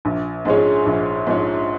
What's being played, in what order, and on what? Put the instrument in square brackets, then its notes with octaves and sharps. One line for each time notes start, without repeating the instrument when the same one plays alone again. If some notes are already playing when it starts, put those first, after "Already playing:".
[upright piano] A#1
G#2 F3 G#3 C#4
A#1
G#2 F3 G#3 C#4